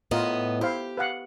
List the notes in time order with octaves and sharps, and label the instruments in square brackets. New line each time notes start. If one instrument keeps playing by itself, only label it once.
[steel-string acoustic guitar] A2 B3 D#5 [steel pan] F4 A#4
[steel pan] E4 C5 F5 [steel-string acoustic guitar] G4
[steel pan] B4 F5 F#5